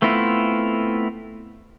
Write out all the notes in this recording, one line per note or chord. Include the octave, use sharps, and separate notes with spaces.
A3 B3 C4 E4 F4